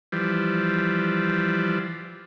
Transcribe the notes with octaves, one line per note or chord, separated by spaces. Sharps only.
E3 F3 G3